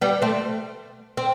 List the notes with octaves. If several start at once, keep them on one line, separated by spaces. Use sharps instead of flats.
G3 B3
A3 C4
C4